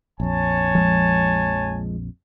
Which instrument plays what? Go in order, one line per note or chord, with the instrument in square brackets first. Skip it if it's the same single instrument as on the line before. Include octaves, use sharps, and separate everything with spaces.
[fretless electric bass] A#1 F2 [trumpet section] C#5 G#5 A5
[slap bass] F3 G#3